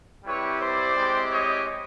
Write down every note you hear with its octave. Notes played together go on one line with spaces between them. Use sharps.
G3 C4 E4 G4 B4 C#5
C5 D5
G#3 C4 E4 G4
C#5 D#5